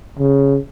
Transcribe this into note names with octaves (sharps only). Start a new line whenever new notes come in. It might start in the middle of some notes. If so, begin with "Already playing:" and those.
C#3